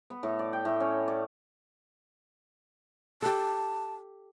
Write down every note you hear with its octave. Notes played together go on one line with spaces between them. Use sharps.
B3
A2
D5
G5
A2
C#4
D5
G4 A4 A5